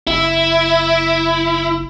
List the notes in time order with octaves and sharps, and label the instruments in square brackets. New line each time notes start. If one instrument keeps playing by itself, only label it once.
[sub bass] F#1 [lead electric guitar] E4